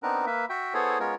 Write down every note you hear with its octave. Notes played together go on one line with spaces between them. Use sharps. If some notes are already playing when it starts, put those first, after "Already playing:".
B3 C4 D4 D#4 A#4 B4
A#3 B4 E5
F#4 E5 G5
B3 E4 G#4 A4 C5 C#5
G#3 B3 C#4 F4 A#4 C#5